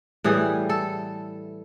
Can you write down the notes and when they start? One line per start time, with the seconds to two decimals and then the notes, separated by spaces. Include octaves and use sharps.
0.24 A2 E3 G3 G#4
0.69 A4